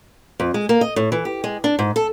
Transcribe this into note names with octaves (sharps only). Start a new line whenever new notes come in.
F2
G#3
A#3
D#5
A2
E3
G4
G#3
D4
G#2
A4